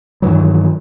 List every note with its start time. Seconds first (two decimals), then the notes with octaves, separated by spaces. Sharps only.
0.22 G2 D#3 E3 F#3